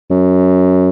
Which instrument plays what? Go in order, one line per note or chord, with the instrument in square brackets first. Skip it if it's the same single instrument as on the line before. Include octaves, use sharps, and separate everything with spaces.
[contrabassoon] F#2